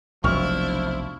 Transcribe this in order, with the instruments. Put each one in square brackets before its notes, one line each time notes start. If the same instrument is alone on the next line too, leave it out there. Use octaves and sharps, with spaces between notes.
[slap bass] F1 B1 F#3 [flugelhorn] F3 [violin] D4 E4 [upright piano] C#6 F6